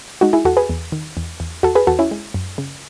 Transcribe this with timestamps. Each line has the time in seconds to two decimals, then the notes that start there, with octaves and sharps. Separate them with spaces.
0.21 G#3 D#4 F#4
0.33 E4 G#4
0.45 E2 F#4 A4
0.57 G#4 B4
0.69 E2
0.92 D#3
1.17 E2
1.40 E2
1.63 E2 F#4 A4
1.75 G#4 B4
1.87 E2 F#4 A4
1.99 C#4 E4
2.11 G#3
2.34 F#2
2.58 C#3